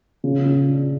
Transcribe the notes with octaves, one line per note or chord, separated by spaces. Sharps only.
C#3
C#3
D4